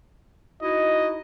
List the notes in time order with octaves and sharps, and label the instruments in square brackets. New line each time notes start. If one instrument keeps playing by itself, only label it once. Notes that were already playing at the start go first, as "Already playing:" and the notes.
[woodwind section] D#4 E4 F#4 [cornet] D#5